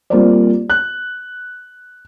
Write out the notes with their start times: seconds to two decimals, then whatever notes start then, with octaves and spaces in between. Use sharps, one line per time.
0.10 G3 A#3 C4 F4 C5 D5
0.70 F#6